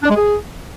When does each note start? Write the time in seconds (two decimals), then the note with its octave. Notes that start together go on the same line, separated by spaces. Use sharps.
0.03 D4
0.09 G#3
0.16 G#4